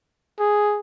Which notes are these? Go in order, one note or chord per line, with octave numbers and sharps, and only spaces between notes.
G#4